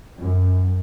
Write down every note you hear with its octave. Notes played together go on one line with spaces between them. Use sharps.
F#2